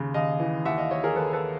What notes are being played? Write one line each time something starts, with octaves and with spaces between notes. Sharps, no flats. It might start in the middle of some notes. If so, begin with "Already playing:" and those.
Already playing: D#2 C#3
D#2 D#5 F5
E3
D#2 E5 F#5
D#5 F5
D#2 C#5 D#5
G#4 A#4
D#2 A4 B4
A4 B4